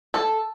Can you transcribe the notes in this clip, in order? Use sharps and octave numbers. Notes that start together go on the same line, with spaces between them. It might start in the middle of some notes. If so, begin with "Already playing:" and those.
A4